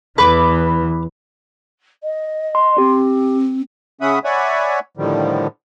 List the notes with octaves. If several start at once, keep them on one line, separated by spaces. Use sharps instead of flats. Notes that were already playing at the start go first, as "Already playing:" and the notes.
E2 E3 B4 D6
D#5
C6
C4 G4
C#3 C#4 E5 F#5 B5 D#6
C#5 D5 E5 F#5 G#5 B5
A2 D3 D#3 F3 G3